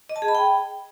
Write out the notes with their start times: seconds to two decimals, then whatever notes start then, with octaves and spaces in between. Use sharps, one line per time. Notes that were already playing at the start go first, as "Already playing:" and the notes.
0.09 D#5
0.16 A5
0.22 G#4
0.28 B5
0.35 G5